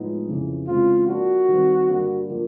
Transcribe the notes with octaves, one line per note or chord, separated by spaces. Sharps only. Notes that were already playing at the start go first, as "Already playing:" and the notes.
Already playing: A2 F3 G#3 B3 D#4
F2 C#3 E3
C#3 E3 G#3 C4 F4
F3 A#3 D4 F#4
D#3 G3 C4
G2 D3 G3 A#3
D3 F3 A#3